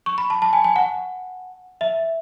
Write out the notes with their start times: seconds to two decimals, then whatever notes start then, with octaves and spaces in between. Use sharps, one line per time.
0.06 C#6
0.18 B5
0.30 A5
0.42 A5
0.53 G#5
0.64 G#5
0.76 F#5
1.81 E5